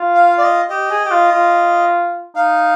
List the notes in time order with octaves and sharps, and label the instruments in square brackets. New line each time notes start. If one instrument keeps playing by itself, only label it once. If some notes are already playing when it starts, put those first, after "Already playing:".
Already playing: [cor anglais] F4
[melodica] F5
D5
D#5
[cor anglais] G4 [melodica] D#5
[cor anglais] G#4
G4
F4
F4
[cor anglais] D#4 [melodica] F5